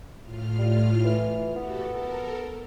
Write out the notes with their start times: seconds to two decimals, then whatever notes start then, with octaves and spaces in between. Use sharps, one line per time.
0.22 A2 F4 F6
0.58 G3
1.04 E3
1.56 B3 F#4 G4 A4
1.87 A4 A#4